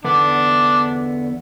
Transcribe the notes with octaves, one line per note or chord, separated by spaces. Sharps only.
E2 D3 B3 D4